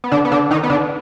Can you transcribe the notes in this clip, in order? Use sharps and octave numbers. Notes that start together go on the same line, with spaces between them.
B3
D3 D4
B3
D3 D4
D#3 D#4
B3
D3 D4